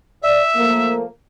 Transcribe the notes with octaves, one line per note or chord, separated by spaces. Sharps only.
D5 E5
F3 A3 A#3